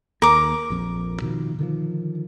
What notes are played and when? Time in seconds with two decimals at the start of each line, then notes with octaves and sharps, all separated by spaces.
0.22 D#2 A#4 D6
0.70 A#1 F2
1.22 B2 D#3 F3
1.59 D3 D#3 F3